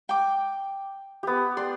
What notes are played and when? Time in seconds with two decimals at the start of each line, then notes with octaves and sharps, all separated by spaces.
0.09 G5 D6
1.23 B3 G4
1.57 D5 C6